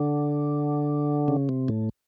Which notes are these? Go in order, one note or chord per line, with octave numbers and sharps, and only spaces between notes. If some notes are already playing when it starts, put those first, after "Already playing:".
Already playing: D3
C#3
C3
A2